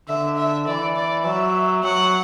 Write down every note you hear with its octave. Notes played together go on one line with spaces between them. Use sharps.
D3 E5
E5
E3 D5
D5
F#3 E5
F#3 F#5